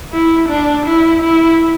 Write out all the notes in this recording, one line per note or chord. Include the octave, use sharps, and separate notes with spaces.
E4
D4
E4
E4